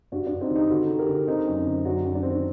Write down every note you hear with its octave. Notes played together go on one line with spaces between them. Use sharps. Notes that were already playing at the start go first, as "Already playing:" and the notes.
G2 D4 F#4
G2 D4
C4 D#4
D#3 D#4 G4
D3 F#4 A4
D3
G4 A#4
D3
D3 C4 D#4
F#2
C4
D3
F#2 D4 F#4
F#2
D4
D#3 C4
D4